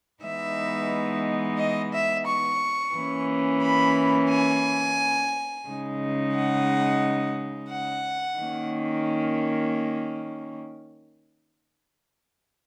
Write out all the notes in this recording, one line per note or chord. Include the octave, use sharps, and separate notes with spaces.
E3 G#3 B3 D#4 E5
D#5
E5
C#6
E3 A#3 C#4
B5
G#5
C#3 G#3 D#4
F#5
F#5
D#3 A#3 C#4